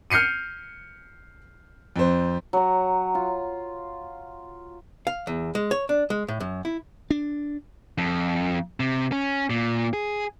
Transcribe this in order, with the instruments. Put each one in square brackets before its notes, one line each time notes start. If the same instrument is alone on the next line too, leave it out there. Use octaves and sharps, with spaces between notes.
[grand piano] F6 G6 C7 C#7 D#7
F2 C5
[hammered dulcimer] F#3 A#5
F4
[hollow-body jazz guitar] F5
E2
G#3
C#5
D4
G#3
A2
F#2
E4
[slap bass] D4
[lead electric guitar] F2
C3
C#4
A#2
G#4